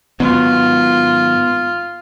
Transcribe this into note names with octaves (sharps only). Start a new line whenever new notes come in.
G#2 D#3 F#3 B3 F4